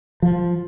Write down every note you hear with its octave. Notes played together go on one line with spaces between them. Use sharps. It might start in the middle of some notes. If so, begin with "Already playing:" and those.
F3